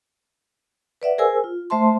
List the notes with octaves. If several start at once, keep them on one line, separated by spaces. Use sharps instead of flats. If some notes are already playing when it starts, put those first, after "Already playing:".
B4 D5 E5 F#5
G#4 A#4 C5 G#5 E6
F4
A3 C5 E5 A5 C6